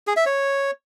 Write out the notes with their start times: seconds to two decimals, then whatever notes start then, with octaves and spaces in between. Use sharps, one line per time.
0.07 G#4
0.17 E5
0.26 C#5